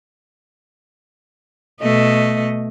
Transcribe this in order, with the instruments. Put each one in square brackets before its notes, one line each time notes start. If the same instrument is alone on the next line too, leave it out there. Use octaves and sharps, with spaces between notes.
[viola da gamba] B2 A3 D#5